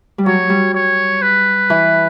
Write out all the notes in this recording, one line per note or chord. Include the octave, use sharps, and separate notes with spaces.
G3
F#3 C#5
G3
C#5
B4
E3